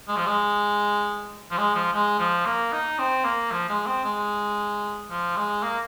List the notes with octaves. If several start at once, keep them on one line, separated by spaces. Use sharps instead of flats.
G#3
F3
G#3
F3
G#3
F3
G#3
F3
A#3
D#4
C4
A#3
F3
G#3
C4
G#3
F3
G#3
A#3